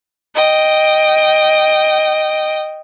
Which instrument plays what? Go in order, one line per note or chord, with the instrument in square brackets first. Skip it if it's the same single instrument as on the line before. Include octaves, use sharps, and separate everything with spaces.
[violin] D#5 G5